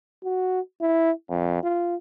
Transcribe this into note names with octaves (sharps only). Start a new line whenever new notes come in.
F#4
E4
F2
F4